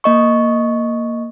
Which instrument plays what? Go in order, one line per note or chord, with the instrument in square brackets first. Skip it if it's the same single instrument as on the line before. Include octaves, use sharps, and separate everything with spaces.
[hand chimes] A#3 D#5 C#6